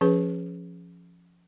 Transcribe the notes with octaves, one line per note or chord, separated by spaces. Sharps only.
F3 C#4 G#4 B4